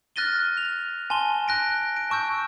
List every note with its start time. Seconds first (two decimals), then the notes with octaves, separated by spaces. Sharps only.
0.16 F6 F#6 A6 A#6 D#7 G7
0.57 F7
1.10 G#5 A5 C6 G7
1.48 F#6 A#6 D7
1.97 D7
2.10 A5 C#6 E6 G6